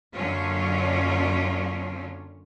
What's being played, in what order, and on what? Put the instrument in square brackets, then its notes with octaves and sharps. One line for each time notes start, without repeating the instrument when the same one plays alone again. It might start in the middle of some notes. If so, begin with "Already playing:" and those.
[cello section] F#2 D3 F#3 A#3 C#4 F4